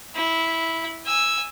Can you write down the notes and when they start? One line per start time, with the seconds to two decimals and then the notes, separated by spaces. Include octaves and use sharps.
0.15 E4
1.06 G#5 E6